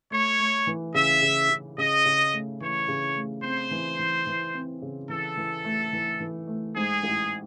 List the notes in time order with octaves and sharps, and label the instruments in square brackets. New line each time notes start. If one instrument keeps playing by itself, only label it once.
[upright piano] A3 [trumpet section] C#5
[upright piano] A3
E3
[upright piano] C#3 [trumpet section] E5
[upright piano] C#3
C#3
[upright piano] C#3 [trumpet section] D#5
[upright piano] C#3
A3
[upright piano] E3 [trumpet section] C#5
[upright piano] C#3
A3
[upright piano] C4 [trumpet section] C5
[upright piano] E3
E3
E3
C4
C#3
[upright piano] E3 [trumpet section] A4
[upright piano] E3
A3
E3
E3
A3
[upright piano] G#2 [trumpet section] G#4
[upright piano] A1